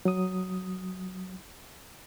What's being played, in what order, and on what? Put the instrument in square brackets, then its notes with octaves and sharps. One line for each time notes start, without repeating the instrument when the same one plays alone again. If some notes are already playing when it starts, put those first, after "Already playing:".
[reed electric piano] F#3 D#6